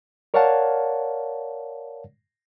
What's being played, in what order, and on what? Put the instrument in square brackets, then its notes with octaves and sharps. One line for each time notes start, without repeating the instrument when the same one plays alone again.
[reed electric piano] A#4 C#5 D5 F5 F#5 A5